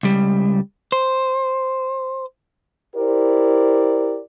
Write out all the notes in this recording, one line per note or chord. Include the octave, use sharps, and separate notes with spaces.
C#2 G3
C5
E4 G4 A#4 C5 D5